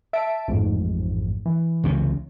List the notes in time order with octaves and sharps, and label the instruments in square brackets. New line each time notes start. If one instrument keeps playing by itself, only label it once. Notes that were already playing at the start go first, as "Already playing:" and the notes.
[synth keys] E5 A5 D7
A1 F2 G#2
E3
[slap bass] C#2 C3 C#4